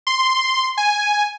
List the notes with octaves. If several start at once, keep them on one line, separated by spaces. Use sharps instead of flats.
C6
G#5